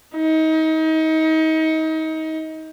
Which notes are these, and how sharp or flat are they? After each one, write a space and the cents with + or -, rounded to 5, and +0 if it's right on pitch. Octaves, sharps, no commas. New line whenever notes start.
D#4 +30